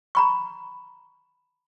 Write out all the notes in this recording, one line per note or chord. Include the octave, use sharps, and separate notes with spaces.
A#5 B5 C#6